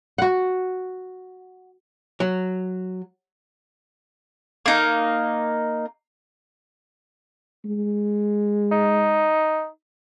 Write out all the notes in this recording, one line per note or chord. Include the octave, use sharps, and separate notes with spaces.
F#4 F#5
F#3
A#3 D#4
G#3
D#4